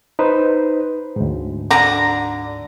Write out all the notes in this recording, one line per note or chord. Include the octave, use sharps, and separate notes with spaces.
D#4 B4 C5
D2 G#2
D3 A#5